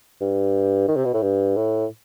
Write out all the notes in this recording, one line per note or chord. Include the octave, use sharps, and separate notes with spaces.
G2
D#3
C3
B2
A2
G2
A2